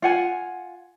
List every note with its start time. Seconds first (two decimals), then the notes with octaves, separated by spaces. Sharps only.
0.02 F4 F#5 G#5